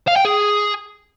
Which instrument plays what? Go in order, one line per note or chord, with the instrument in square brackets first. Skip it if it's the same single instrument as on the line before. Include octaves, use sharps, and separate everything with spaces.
[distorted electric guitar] F5
G5
G#4